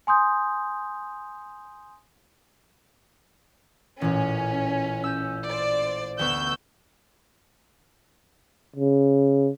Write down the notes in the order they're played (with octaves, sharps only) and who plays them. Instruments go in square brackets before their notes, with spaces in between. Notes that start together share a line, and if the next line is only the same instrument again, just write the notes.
[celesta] G#5 C6 D#6 G6
[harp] A1 A#2 [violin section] C#4
[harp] E6 G6
[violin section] C5 D5
[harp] D2 B3 C#6 [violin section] E6 G6
[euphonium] C#3